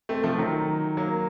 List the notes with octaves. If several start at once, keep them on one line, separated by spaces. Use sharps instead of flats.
A3 C4
F3 A3
D#3 F#3
F#3 A#3